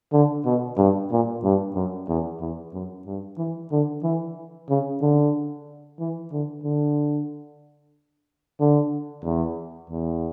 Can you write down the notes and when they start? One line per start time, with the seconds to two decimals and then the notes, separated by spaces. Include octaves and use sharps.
0.13 D3
0.46 B2
0.78 G2
1.11 A#2
1.44 G2
1.75 F#2
2.08 E2
2.41 E2
2.74 F#2
3.07 G2
3.38 E3
3.71 D3
4.03 E3
4.69 C#3
5.02 D3
5.99 E3
6.32 D3
6.64 D3
8.60 D3
9.24 E2
9.90 E2